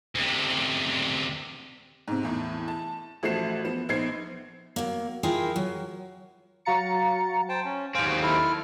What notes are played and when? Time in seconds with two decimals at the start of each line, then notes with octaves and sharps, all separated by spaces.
0.15 D2 C3
2.08 G#2 C3
2.23 E2 A2
2.68 A5
3.23 A1 F3 A3 F#4 C7 E7
3.65 F3 B3 E7
3.89 A#1 B3 D#4 C5 G#6 C7
4.76 F#3 A#3
5.23 E4 F4 G#4 A#4 G5
5.56 F#3
6.65 F#3 F#4 F5 A#5 A6 C#7
7.49 C5 G5 A5
7.65 C#4
7.95 D#2 C4 C5 F5 G#5
8.07 F#4
8.22 E4 A4 F6